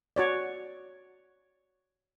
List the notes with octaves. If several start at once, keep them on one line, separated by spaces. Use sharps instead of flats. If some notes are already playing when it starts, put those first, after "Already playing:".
F#4 C#5 D5